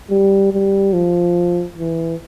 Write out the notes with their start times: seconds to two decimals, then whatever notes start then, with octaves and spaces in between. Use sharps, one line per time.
0.10 G3
0.53 G3
0.93 F3
1.78 E3